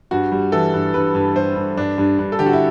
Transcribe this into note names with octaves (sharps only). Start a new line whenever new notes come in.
G2 F#4
G3
E3 A4
G2
G2 B4
G2
G3 C5
G2
G2 D4
G2
G2
A4
D3 G4
F#4
E4